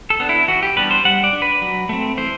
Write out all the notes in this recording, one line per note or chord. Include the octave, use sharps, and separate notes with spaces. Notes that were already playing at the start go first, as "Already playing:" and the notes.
A4
B3 D4
E4
E3 F#4
G4
G3 B3 D4 B4
C5
G3 F#5
D5
D4
B4
F#3
A3 C4
E3 C5